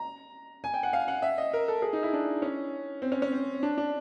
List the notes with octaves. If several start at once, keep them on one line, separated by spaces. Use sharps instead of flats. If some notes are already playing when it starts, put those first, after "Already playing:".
Already playing: A#5
G#5
G5
F#5
F5
F#5
E5
D#5
A#4
A4
G#4
D#4
E4
D4
C#4
C4
C#4
C#4
C4
D4
D4